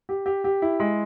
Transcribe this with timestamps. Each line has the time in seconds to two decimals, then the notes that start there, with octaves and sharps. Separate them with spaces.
0.09 G4
0.26 G4
0.44 G4
0.62 E4
0.80 G#3